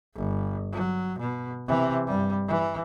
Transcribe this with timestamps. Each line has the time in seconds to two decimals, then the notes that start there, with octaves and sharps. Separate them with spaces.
0.15 G1
0.72 F#3
1.19 B2
1.67 C3 E3
2.07 G2 G3
2.47 E3